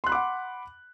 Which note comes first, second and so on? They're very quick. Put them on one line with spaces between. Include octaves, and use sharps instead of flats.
C6 F#6 B5 D6 F#5